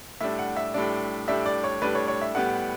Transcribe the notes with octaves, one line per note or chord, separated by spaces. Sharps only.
A2 G3 D4 E5
F#5
E5
A2 G3 D4
A2 G3 D4 E5
D5
C#5
A2 G3 D4 B4
C#5
C#5
E5
A2 G3 B3 F#5